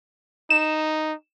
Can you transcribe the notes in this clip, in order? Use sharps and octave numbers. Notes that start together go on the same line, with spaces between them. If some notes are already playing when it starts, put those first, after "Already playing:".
D#4 E7